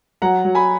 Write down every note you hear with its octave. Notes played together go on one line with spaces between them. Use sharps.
F#3 F#5 A#5
F#3
G#5 B5